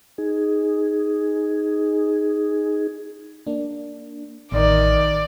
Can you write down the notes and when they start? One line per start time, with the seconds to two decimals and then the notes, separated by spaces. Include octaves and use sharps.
0.18 D#4 G#4
3.47 A#3 D4
4.52 A1 D#3 D5